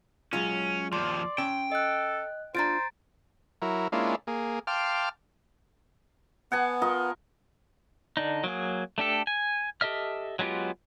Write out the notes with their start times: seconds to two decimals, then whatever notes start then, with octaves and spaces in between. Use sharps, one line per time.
0.33 F#3 G#3 C#4 F4
0.93 D#2 F3 D5 C6
1.38 C#4 E5 G5 A5
1.72 A4 D#5 F#6
2.55 D4 F4 C5 A#5 A6 D7
3.62 F#3 E4 A#4
3.92 G#3 A#3 C#4 D4 E4 F4
4.27 A#3 G#4
4.67 F5 G5 A5 C6 D6 F6
6.52 B3 F#5 G#5 A5
6.82 F4 A#4 D#5
8.17 D3 D4 D#4
8.44 F#3 A#3 G#4
8.98 A3 D4 G4 A4
9.27 G#5
9.81 G4 A4 D#5 E5 F6
10.39 F#3 G#3 B3 F4 G4